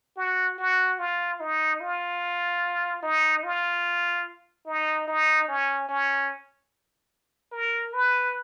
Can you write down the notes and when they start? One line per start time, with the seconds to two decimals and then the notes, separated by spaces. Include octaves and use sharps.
0.17 F#4
0.58 F#4
0.99 F4
1.40 D#4
1.81 F4
3.03 D#4
3.43 F4
4.67 D#4
5.07 D#4
5.48 C#4
5.89 C#4
7.52 A#4
7.93 B4